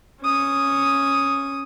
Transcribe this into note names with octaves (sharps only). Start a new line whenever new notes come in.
C#4 D#6